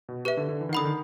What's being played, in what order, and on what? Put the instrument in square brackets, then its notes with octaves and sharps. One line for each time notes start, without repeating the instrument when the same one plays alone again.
[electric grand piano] B2
[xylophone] G4 B4 E5
[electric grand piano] D3
D3
E3
D#3
[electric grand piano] D3 [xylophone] F#5 B5 D#6
[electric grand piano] D#3